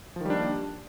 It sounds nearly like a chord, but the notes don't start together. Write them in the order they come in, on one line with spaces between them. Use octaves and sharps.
F3 D#3 G3 D4 A#3